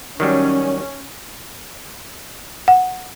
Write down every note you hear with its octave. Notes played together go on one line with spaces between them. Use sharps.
D#3 F#3 G3 C#4
F#5